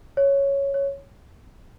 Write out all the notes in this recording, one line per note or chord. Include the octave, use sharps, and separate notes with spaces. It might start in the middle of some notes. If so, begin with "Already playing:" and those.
C#5
C#5